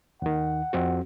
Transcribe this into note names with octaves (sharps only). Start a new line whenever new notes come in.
D#2 D#3 F#5
F2 C4 F#4